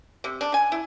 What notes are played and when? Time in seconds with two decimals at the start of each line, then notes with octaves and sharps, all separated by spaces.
0.24 C3
0.41 D4
0.54 G#5
0.72 E4